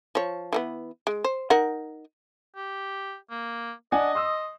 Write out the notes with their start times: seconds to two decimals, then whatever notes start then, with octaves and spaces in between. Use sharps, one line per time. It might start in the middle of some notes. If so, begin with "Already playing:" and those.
0.15 F3 C#5
0.53 E3 A#3 B3
1.07 G#3
1.24 C5
1.50 D#4 A#4 F#5
2.56 G4
3.30 A#3
3.92 D4 D#5 F#5 G#5
4.15 C6 D#6 E6